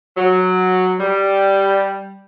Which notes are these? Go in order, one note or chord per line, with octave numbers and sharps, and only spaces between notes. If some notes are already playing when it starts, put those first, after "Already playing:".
F#3
G3